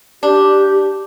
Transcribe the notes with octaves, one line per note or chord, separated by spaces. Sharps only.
D4 G4